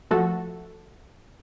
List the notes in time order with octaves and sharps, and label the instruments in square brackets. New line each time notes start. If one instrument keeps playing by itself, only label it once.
[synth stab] F3 A3 F#4 A4